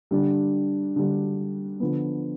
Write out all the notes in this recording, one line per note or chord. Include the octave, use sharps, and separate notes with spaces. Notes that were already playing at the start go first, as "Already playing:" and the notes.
D3 G3 D4
D3 G3 D4
D3 F3 B3